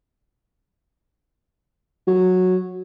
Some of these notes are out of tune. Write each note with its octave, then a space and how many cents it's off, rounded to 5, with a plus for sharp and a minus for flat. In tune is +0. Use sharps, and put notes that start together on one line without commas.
F#3 -10